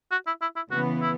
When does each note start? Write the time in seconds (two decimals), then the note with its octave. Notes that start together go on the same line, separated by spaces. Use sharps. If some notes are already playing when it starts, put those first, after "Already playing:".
0.11 F#4
0.27 E4
0.41 E4
0.56 E4
0.71 C#3 E3 B3 F#4
1.02 E4